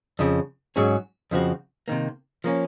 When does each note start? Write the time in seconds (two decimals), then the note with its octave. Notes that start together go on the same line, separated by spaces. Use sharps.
0.19 F2 C#3 F3
0.76 G#2 F#3 C#4 G#4
1.31 F2 C#3 F3 C4 F#4
1.88 C3 D#3 A#3
2.44 F3 A#3 C#4